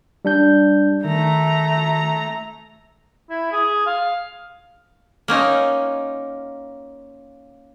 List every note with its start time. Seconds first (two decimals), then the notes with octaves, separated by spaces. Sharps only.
0.25 G3 D4 G6
1.05 D#3 A3 A#5
3.30 E4
3.52 G#4
3.86 F5
5.28 A#3 C#4 D#4 F4